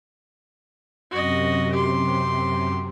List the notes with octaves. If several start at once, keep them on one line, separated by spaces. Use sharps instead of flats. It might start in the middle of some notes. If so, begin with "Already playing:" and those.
F#2 C3 F#4 D#5
G4 C6